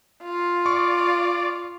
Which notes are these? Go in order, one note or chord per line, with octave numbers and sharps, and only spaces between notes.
F4
D5 C#6